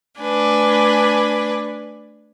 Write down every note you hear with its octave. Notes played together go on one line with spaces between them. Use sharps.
A3 D4 B4 G#5